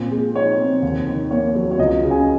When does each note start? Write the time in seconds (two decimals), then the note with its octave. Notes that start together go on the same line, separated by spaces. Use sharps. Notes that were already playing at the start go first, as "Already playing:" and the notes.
Already playing: A#2 C4
0.11 G#3
0.35 D#4 C#5
0.59 C4
0.82 D#2
1.07 D#3
1.31 A#3 C#5
1.55 F#3
1.71 C#5
1.78 C#2 D#5
2.03 C#3
2.11 G#5